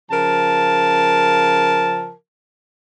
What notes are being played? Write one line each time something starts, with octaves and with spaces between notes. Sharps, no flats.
C#3 F3 A#4 A5